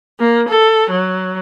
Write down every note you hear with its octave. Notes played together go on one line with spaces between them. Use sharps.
A#3
A4
F#3